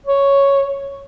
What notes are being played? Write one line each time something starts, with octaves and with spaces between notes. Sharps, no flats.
C#5